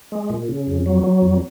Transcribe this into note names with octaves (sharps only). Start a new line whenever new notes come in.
G#3
A#2
C#3
F2
F#3
F#3
F2